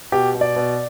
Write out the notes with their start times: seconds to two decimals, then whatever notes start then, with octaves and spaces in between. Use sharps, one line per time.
0.12 B2 G4
0.34 B2
0.41 D5
0.56 B2